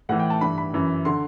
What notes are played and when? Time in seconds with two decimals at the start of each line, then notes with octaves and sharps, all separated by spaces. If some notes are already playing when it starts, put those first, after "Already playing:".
0.09 A2 E3 F#5
0.19 G5
0.30 A5
0.41 G2 E3 B5
0.58 B5
0.74 F#2 E3
1.05 D3 C6